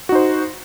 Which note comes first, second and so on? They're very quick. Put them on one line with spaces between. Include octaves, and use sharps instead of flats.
F#4 D#4 C5